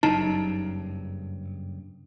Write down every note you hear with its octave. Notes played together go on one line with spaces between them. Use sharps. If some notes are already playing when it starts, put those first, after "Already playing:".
F#1 G2 C#3 D#4 A5